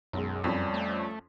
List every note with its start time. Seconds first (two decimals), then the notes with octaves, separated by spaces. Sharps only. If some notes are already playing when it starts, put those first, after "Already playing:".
0.13 B1 F#2 G#3
0.44 F2 F3 G3 C#4 B6
0.74 A3